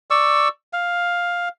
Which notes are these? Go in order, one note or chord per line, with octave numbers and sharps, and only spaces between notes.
D5 C#6 E6
F5